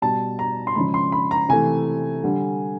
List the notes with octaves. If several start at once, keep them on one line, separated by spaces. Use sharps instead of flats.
B2 G3 A5
A#5
C6
C#3 F3 G#3 B5
C6
B5
A#5
C3 E3 A3 G#5
D3 G3